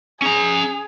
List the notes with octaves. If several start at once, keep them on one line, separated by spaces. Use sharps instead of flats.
C#4 G#4 A#5